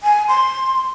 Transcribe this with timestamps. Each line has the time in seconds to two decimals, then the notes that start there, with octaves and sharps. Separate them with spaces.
0.03 G#5
0.28 C6